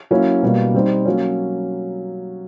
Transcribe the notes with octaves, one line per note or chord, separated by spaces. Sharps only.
F#3 A#3 C#4 E4
B2 G3 A#3
G3 C4 D#4
F#3 A#3 C#4